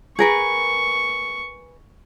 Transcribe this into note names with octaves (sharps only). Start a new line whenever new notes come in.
G#4 A#4 B4 C#6